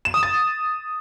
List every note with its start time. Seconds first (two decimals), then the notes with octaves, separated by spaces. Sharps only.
0.05 E7
0.14 D#6
0.23 A6